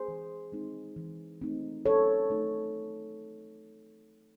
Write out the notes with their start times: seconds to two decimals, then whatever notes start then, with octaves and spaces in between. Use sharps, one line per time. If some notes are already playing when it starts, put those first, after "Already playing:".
Already playing: G#4 C5
0.08 E3
0.52 G#3 C4 D#4
0.97 E3
1.41 A3 C4 D#4
1.85 F#3 A4 C#5
2.30 A3 D#4